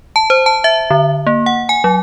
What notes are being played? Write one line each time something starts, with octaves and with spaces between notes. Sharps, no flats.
A5
C5
A5
E5
D3
A#3
F#5
G#5
F#3